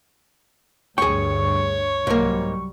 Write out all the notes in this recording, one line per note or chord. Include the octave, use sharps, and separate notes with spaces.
D2 G2 G#4 C#5 G5 C#6
C2 G#2 F#3 G3 A#3